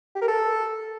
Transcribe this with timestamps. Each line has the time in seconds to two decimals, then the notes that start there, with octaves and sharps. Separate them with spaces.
0.15 G4
0.22 A#4
0.28 A4